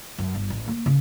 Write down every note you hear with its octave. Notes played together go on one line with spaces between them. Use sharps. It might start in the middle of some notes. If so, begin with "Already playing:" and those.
F#2
G1
A1
A#3
C#3